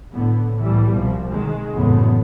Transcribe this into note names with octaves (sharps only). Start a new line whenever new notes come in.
A2 D3 B3
C2 A2 E3 G3
C2 B2 F3
D#3 G#3
F#1 E2 A2 G#3 B3